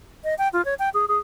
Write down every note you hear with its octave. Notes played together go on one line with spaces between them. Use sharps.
D#5
G5
F4
C#5
G5
G#4
G#4